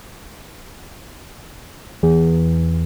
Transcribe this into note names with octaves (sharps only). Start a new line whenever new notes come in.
E2